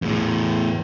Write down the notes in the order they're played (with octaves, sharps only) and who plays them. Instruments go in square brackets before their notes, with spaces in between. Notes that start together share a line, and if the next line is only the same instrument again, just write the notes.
[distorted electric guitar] E2 A2